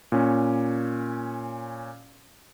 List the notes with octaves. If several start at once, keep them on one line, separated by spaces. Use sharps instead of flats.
A#2 C#4